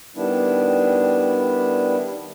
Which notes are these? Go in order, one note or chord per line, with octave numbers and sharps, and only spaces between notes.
D#3 G3 B3 D4 E4